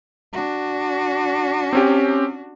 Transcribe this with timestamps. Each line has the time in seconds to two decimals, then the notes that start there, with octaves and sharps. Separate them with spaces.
0.32 D4 F#4
1.73 C4 C#4 G4